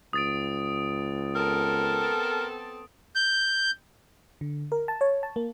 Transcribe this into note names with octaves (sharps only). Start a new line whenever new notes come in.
C#2 D#6 A6 D7
B3 C4 A4 A#4
G6
D3
A#4
A5
C#5
A5
A#3